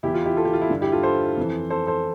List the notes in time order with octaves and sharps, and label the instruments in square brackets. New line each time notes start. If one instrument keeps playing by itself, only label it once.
[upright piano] E2 E4 G4
E3
F4
E4 G4
F4 A4
E4 G4
F4
E4
G2 D3
E4 G4
F4 A4
A4 C5
F2 E3
A4 C5
A4 C5